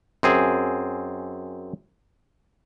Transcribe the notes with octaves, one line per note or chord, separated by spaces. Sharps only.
F#2 C4 G#4